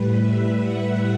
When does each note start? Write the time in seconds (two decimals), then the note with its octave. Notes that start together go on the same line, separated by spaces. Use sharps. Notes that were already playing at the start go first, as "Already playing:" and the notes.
Already playing: A2 G3 B4
0.17 E5
0.60 F#5